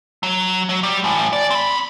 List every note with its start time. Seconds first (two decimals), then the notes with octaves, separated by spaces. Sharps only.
0.23 F#3
0.69 F#3
0.83 G3
1.04 A2 E3
1.33 D5
1.50 C4 B5